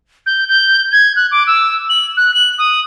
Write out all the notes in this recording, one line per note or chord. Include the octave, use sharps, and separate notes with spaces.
G6
G6
G#6
F#6
D6
E6
F#7
F#6
F#7
D#6